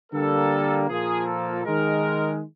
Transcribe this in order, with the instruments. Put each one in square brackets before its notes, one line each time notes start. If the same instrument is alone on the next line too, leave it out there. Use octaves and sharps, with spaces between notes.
[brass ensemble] D3 G3 A#3 A4
A#2 F3 A#3 G#4
A4
D#3 G#3 A#4